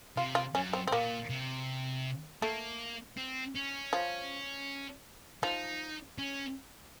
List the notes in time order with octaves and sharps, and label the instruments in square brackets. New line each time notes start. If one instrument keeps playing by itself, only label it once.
[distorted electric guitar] C3 [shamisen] F4
[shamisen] F4
[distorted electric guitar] F#2 [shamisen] C#4
[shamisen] C4
C4
[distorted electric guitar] A#2 [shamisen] A#3
[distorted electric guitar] C3
[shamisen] A3 [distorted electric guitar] A#3
[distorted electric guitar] C4
C#4
[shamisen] F3
[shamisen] F3 [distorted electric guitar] D#4
[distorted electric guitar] C#4